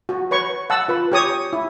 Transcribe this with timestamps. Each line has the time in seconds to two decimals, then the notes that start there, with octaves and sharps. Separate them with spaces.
0.09 F#4
0.31 B4 C#5 C#6
0.70 F#5 A5 E6
0.88 F4 B4
1.12 G4 C#5 D#6
1.53 E4